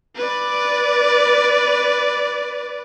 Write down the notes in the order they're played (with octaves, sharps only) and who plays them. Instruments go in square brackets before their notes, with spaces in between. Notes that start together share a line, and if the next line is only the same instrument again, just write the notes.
[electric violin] B4 D5